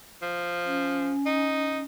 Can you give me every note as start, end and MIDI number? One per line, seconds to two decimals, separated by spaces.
0.22 1.11 53
0.65 1.83 61
1.26 1.79 63